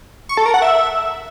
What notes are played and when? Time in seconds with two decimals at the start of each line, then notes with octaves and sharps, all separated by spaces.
0.29 C#6
0.37 A4
0.46 A#4
0.54 F#5
0.62 E5